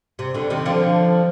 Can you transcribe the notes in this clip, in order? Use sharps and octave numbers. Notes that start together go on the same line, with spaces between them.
C3
B2 D3
C3 D#3
D3 F3